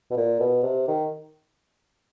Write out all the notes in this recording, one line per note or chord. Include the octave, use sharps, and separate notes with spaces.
B2
A#2
B2
C3
D#3